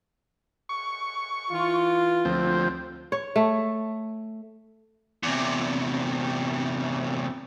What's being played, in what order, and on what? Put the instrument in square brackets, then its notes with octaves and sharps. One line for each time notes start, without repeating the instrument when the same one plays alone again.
[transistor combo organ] C#6
[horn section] E3 F4
[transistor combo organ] D2 F3 C4
[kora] C#5
A3
[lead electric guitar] E2 C3